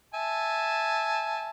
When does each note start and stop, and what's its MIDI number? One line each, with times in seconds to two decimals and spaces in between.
0.14 1.49 76
0.14 1.49 80
0.14 1.49 81